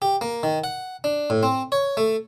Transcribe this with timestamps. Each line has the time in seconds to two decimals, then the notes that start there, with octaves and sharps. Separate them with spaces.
0.02 G4
0.21 A#3
0.43 D#3
0.64 F#5
1.04 D4
1.30 A2
1.43 C4
1.72 C#5
1.97 A3